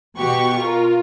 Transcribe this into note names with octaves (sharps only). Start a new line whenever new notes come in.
B2 F#4 G4 C#6
F4 A#4